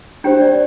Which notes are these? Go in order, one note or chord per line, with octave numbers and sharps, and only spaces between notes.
D4 G4 C5 G5
D5